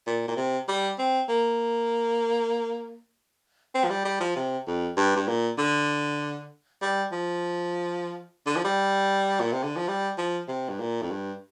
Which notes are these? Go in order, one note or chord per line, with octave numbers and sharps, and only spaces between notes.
A#2
A#2
C3
G3
C4
A#3
C4
F3
G3
G3
F3
C3
F2
G2
G2
A#2
D3
G3
F3
D3
F3
G3
A#2
C3
D3
F3
G3
F3
C3
G2
A#2
F2
G2